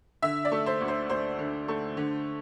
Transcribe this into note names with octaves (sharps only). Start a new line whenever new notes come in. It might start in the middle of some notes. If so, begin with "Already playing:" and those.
D3 E5
D5
A3
C5
D2
C5
D2 C5
D3
A3
D3